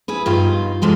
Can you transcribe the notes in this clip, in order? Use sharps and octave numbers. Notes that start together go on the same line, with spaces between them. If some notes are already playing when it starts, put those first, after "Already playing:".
E4 G#4 B4
G2 B2 D#4 F4
F2 C3 F3 G#3 C4